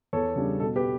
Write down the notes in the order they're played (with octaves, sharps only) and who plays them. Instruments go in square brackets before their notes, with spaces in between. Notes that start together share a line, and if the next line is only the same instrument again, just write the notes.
[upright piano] E2 A4 C#5
C#3 G3 D4
B2 A4
G4 B4